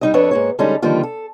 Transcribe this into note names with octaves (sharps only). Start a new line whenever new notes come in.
G3 D#4 D#5
F2 D4 A4 B4 C#5
G#2 A#3 C#5
D3 G3 G#3 C#4 D#4 A4
D3 D#3 F3 G3 A#3 F4
A4